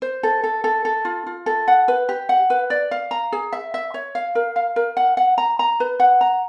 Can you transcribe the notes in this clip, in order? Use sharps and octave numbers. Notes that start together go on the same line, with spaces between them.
C5
A4
A4
A4
A4
F4
F4
A4
F#5
B4
G4
F#5
B4
D5
F5
A#5
G#4
E5
E5
C#5
F5
A#4
F5
A#4
F#5
F#5
A#5
A#5
B4
F#5
A#5